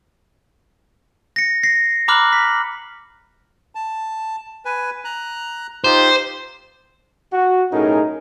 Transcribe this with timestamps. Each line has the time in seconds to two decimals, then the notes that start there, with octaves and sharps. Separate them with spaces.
1.36 A#6 C#7
1.63 A#6 C7
2.08 A#5 B5 D6 F6 F#6 F#7
2.33 B6
3.75 A5
4.65 B4 G#5
5.05 A#5 F#6
5.84 D#4 F4 G4 C5
7.33 F#4
7.72 B1 A2 C#4 D#4 G#4 A#4